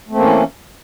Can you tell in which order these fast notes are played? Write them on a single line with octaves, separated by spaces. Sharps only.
A3 C4 A#3 E3 C#4